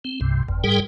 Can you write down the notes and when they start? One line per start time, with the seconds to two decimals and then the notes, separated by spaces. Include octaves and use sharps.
0.05 C4
0.21 C2 G2 C3
0.48 G1 F2
0.64 G#2 G3 G#4 A#4 G5